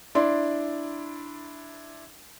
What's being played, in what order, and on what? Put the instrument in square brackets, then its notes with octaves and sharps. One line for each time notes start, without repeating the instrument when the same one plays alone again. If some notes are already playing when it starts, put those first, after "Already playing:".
[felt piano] D4 E4 D5 C6